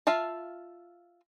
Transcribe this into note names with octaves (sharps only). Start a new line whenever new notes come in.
F4 E5 F5 A5